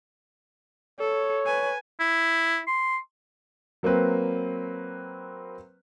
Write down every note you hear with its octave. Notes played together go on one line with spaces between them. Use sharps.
A4 C#5
B4 G#5
E4
C6
F#3 A#3 C4 B4